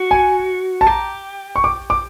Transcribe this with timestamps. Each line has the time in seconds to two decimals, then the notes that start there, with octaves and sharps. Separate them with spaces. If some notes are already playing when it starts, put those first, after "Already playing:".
Already playing: F#4
0.11 G#5
0.81 A5
0.87 G4 A#5
1.56 C#6
1.64 D6
1.90 D6